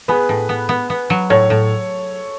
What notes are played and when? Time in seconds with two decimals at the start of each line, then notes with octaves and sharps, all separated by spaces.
0.08 B3 G#4 B4
0.29 A2
0.49 B3
0.69 B3
0.90 B3
1.10 F#3
1.30 A2 A4 C#5
1.50 A2